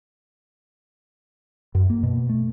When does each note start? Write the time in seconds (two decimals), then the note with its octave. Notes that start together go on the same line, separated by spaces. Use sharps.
1.75 F#2
1.90 A#3
2.03 B2
2.29 A3